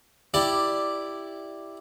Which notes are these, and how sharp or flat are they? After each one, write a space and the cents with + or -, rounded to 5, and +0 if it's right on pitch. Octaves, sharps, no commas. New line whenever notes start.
E4 +0 G4 +0 D5 +5